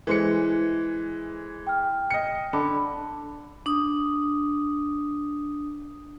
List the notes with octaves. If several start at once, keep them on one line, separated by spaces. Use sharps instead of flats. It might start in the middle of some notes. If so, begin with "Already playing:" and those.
E3 G#3 A4 B4 C5 C#7
G5 F6
D#5 C#7
D3 A5 B5 D6
D4 D#6